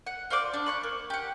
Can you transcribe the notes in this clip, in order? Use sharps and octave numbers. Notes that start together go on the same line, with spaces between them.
F#5
F4 C5 D5 D6
D4
B5 C#6 F#6
A#3
G4 F#5